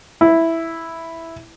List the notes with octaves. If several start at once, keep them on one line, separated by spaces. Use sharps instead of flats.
E4